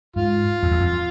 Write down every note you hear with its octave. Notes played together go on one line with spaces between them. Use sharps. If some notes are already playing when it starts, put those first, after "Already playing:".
G#2 F4
F2
E2
F2